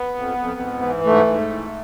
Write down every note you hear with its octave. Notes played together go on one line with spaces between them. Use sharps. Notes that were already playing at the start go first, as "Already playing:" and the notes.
Already playing: B3
F2
F2
G#2
E3
G#2 A3
G#2
E3